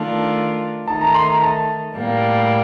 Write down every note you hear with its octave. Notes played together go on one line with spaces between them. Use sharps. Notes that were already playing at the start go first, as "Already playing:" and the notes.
Already playing: D#3 A3 D4 F4 A5
D#3 A3 D#4 A5
A#5
C6
A#5
A5
A2 G3 A#3